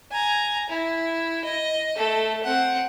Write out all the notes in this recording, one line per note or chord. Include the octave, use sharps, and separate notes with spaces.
G#5 A#5
E4
D#5
A3 A4
C4 F#5